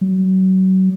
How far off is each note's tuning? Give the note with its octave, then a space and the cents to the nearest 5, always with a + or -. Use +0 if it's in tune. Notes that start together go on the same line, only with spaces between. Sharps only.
F#3 +30